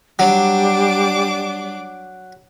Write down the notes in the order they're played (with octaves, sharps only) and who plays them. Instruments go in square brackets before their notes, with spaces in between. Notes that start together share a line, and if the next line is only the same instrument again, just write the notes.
[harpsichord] F#3 [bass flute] G3 [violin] D4 D6